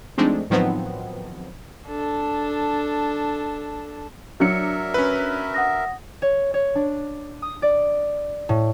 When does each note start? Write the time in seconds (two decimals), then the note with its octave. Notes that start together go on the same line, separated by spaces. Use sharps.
0.18 F3 G#3 A3 C4 D4 D#4
0.50 A2 D#3 F3 F#3 B3 C4
1.87 D4 A4
4.40 F#3 D4 A#4 E5 C#7
4.94 C#4 B4
5.54 F#5 D#6 A#6
6.22 C#5
6.54 C#5
6.75 D4
7.42 D#6
7.62 D5
8.49 A2